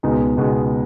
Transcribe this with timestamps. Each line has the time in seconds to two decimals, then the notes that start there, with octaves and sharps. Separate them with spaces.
0.03 C#2 B2 G#3 B3 D#4
0.37 C#2 B2 G#3 B3 D#4